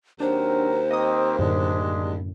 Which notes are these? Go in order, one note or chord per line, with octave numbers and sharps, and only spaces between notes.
D#2 F#3 C4 D4 A#4 C5
A#3 C4 D#5 D#6
F#2 A2 D3 G#3 D4